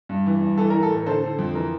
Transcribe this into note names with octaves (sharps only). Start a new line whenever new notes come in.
G2
E3
G2
E3 A4
E3 A#4
A4
A2 A#4
D3 A4 C5
D3
F2
E3 A#4